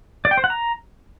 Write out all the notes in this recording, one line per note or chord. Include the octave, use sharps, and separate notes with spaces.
D5
G5
C5
F#5
A#5